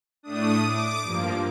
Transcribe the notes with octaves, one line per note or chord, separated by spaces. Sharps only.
A2 A3 D4 D#6
D6
G2 F3 A#3